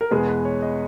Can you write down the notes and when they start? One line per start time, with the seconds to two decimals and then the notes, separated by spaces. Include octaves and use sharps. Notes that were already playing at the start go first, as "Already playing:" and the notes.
0.01 A#4
0.11 E2 B2 G#3 B3 G#4
0.28 B4
0.45 C#5
0.62 D#5